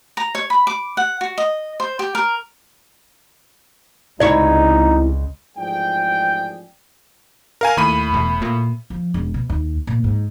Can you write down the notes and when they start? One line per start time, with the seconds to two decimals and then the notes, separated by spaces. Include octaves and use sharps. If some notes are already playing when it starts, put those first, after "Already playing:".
0.17 A#5
0.35 C#5
0.50 B5
0.67 D6
0.97 F#5
1.21 F#4
1.38 D#5
1.80 C5
1.99 G4
2.15 A#4
4.20 C#2 C3 D#4 E4 C#5 D5
5.57 A1 G#2 F3 G#4 D5 G5
7.61 A#4 F5 G#5
7.77 D#2 A2 B5 D#7
8.14 E1
8.42 A#2
8.90 F3
9.14 E1
9.34 B2
9.50 D#2
9.87 A#2
10.04 G#2